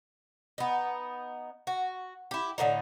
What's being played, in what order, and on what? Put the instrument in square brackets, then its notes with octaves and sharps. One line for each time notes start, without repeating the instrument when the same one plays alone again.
[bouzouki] B3 D#4
F#4
E4 G4
A2 D3 E3 D#4